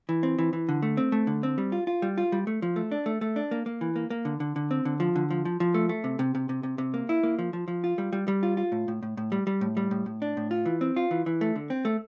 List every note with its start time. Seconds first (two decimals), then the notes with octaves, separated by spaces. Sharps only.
0.09 E3
0.23 C4
0.39 E3
0.53 E3
0.69 D3
0.82 A3
0.97 C4
1.12 A3
1.27 D3
1.43 C4
1.58 G3
1.72 F4
1.87 F4
2.02 G3
2.18 F4
2.32 G3
2.47 A3
2.62 F3
2.76 A3
2.92 D4
3.06 A3
3.21 A3
3.36 D4
3.51 A#3
3.66 A#3
3.81 E3
3.96 A#3
4.10 A#3
4.25 D3
4.40 D3
4.56 D3
4.71 C4
4.85 D3
5.00 F3
5.16 D3
5.31 F3
5.45 F3
5.60 F3
5.74 A3
5.89 A3
6.04 C3
6.19 C3
6.35 C3
6.49 C3
6.63 C3
6.78 C3
6.94 A#3
7.09 E4
7.23 A#3
7.39 F3
7.53 F3
7.68 F3
7.84 F4
7.98 G3
8.13 G3
8.28 G3
8.43 F4
8.57 F4
8.72 A2
8.88 A2
9.03 A2
9.17 A2
9.32 G3
9.47 G3
9.61 A2
9.77 G3
9.91 A2
10.06 A2
10.22 D4
10.37 A2
10.51 F4
10.66 E3
10.81 C4
10.96 F4
11.11 E3
11.26 E3
11.41 A3
11.56 D3
11.70 C4
11.85 A3